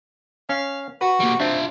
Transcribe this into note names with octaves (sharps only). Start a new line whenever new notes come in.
C#4 F5
F#4 B4
G3 A#3
C4 D4 F4 E5